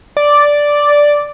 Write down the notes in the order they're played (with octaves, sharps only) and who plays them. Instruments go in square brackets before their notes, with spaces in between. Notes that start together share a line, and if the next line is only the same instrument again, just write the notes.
[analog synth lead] D5